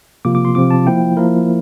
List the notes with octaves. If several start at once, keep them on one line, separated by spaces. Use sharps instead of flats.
C3 F3 A#3 F4 D6
D6
C6
C3 F3 C4 F4 D6
A5
F3 A#3 E4 G5
F3 A#3 E4 A#4